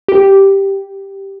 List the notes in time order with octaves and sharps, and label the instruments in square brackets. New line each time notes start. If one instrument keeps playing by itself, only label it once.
[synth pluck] G4